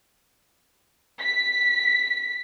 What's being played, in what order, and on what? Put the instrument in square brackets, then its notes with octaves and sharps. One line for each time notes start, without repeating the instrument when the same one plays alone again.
[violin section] B6